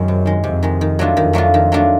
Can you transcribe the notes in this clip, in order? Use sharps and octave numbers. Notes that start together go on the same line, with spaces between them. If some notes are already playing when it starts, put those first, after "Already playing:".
Already playing: F#2 D#3 G#3
C3
D#3 G#3
F2 C3
D#3 G#3
D#3
F#3 A3 D4 F4
F2 D#3
F#3 A3 D4 F4
D#3
F#3 A3 D4 F4